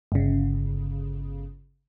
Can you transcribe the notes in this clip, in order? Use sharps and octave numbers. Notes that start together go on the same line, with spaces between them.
G1 C#3